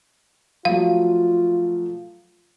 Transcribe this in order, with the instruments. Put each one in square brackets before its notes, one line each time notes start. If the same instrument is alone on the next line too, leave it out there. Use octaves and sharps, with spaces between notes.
[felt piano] F3 F#3 A3 [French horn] F4 [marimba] F5